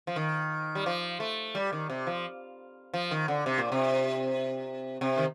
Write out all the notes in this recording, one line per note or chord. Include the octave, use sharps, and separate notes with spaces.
F3
D#3
G3
F3
A3
G3
D#3
C3
F3
F3
D#3
D3
C3
A#2
C3
C3
D#3